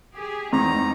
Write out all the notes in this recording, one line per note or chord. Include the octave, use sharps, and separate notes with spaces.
G4 G#4
E2 G#3 A3 C4 D#4 A#5